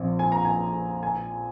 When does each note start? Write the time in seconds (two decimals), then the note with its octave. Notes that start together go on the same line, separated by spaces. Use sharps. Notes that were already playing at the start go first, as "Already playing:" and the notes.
Already playing: A#1 C4
0.19 G#5
0.32 A#5
0.45 G#5
1.03 G#5